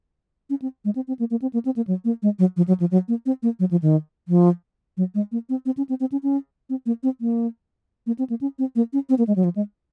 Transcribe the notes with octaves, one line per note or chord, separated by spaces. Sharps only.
C#4
C4
G#3
C4
C4
A#3
A#3
C4
A#3
C4
A#3
F#3
A#3
G#3
F#3
F3
F#3
F3
F#3
A#3
C4
A#3
F#3
F3
D#3
F3
F#3
G#3
A#3
C4
C4
C#4
C4
C4
C#4
C#4
C4
A#3
C4
A#3
A#3
C4
A#3
C#4
C4
A#3
C#4
C4
A#3
G#3
F#3
F3
G#3